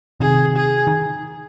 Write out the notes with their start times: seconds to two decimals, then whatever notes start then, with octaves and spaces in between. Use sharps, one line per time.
0.20 C3 D#3 G#4
0.56 G#4
0.87 D#3